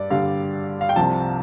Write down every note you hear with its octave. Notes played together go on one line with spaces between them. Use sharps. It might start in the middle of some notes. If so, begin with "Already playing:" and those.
Already playing: G2 G3 D5
G2 D3 G3 F5
F5
G5
C2 C3 F3 A5